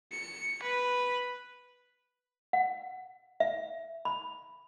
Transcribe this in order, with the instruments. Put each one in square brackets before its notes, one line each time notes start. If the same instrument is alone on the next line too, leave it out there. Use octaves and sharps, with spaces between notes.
[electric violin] C#7
B4
[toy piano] F#5
E5
B5